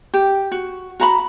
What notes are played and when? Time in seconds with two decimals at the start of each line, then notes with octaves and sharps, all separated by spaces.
0.14 G4
0.52 F#4
1.00 F#4 A#5 B5